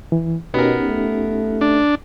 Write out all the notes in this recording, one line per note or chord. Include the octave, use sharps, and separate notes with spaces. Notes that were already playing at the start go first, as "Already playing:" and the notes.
E3
B2 B3 C#4 D#4 G4 A#4
A3
D4